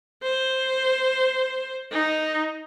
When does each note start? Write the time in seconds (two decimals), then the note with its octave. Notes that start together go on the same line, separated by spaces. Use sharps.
0.23 C5
1.92 D#4